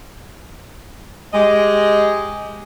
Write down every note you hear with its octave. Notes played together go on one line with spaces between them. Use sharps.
G#3 G4 D#5